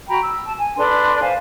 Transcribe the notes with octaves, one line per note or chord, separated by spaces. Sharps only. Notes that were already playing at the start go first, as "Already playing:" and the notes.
F#4 G5 A#5 B5
E6
A5
G#5
D4 A4 B4 C6
C5 E5 F5 G#5